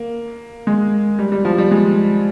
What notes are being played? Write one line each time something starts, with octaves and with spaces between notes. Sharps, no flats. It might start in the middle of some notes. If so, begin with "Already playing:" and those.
Already playing: A#3
G#3
G3
G3
F3
G3
G#3